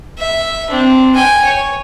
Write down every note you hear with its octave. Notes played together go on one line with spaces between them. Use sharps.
E5
C4 D4
G5 G#5
C#5